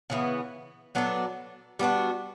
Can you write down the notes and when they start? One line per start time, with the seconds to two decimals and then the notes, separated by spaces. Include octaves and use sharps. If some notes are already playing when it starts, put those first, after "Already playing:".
0.10 C#3 E3 B3
0.95 F#3 B3 D4 A4
1.79 G3 B3 D4 F#4